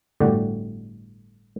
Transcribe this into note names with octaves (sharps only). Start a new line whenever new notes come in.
G1 A2 D3 F#4 G4 D5